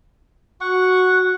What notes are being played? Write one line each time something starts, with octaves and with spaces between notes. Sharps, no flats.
F#4 F#5 C#6